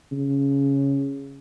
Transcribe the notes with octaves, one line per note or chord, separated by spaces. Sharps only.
C#3